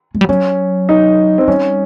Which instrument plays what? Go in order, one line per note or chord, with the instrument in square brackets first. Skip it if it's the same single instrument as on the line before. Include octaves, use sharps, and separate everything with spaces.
[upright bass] G#3
G3
[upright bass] F#3 [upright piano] C#4
[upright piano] D#4
C4
[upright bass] G3 [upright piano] C#4